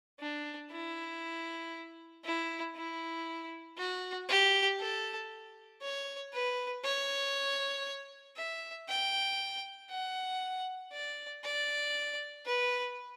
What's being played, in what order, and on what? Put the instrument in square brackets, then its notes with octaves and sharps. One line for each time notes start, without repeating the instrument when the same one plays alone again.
[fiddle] D4
E4
E4
E4
F#4
G4
A4
C#5
B4
C#5
E5
G5
F#5
D5
D5
B4